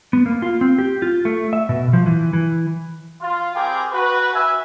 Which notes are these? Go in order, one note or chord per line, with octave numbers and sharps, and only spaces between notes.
B3
A#3
F4
C4
G4
F4
A3
E5
B2
F3
E3
E3
F4
G3 C4 G#4 A#4 G5 D6
F#4 B4
E5 G#5